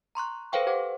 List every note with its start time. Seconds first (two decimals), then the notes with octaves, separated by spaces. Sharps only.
0.15 A#5 C6 C#6 F#6
0.52 A4 B4 C5 F5 G5 C#6
0.67 G4 C5 F#5 D6